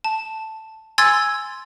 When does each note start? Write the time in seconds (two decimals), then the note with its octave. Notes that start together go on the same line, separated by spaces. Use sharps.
0.04 A5
0.98 G#5 C6 E6 G#6 A6